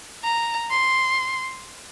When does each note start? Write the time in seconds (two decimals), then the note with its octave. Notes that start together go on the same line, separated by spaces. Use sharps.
0.24 A#5
0.71 C6